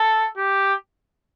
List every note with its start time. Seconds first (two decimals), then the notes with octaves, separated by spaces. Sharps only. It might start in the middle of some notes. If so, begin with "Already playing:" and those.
Already playing: A4
0.37 G4